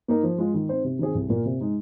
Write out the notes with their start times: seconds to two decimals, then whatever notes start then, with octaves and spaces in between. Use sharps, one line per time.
0.08 A#3 D#4 A#4
0.23 F3
0.38 G#3 F4
0.54 D#3
0.69 C4 D#4 C5
0.84 C3
0.99 D#3 C4 G#4
1.15 C2
1.29 A#2 A#3 F4 A#4
1.46 C3
1.61 G#3 D#4